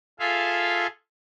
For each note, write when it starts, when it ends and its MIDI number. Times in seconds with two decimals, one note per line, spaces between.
0.20 0.87 65
0.20 0.87 68
0.20 0.87 69
0.20 0.87 76
0.20 0.87 77